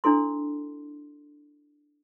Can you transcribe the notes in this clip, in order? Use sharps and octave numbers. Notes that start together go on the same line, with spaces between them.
D4 E4 A4 C6